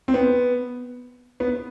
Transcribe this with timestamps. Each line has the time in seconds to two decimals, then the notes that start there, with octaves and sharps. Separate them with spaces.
0.08 C4
0.14 B3
1.40 B3